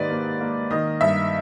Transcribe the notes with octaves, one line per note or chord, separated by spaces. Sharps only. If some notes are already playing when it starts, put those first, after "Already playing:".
Already playing: G#2 D#3 A#3 G4 B4 D5
A#3
A#3
D#3 D#5
G2 E5